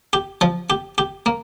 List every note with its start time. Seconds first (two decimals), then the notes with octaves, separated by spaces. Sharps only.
0.13 G4
0.41 F3
0.70 G4
0.98 G4
1.26 A#3